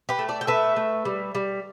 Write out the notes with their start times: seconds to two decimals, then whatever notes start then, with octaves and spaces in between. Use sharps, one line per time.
0.09 G4 B4
0.19 A3
0.29 A4 D5
0.41 G5
0.47 A3 B4 E5
0.76 A3
1.05 G3
1.35 G3